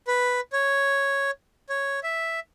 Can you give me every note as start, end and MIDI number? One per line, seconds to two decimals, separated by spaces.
0.08 0.40 71
0.53 1.31 73
1.69 2.00 73
2.04 2.40 76